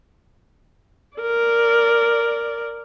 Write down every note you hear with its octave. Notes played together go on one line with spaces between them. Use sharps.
A#4 D5